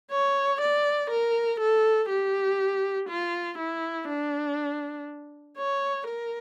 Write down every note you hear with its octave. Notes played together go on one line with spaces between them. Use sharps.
C#5
D5
A#4
A4
G4
F4
E4
D4
C#5
A#4